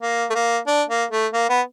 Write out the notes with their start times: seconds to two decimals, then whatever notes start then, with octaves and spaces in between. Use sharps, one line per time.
0.02 A#3
0.30 A3
0.35 A#3
0.67 D4
0.89 A#3
1.12 A3
1.33 A#3
1.50 B3